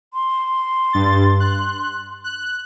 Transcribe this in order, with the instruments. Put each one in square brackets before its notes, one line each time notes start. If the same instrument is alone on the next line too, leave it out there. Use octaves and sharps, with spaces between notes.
[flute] C6
[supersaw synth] G2 A6
F#6
F#6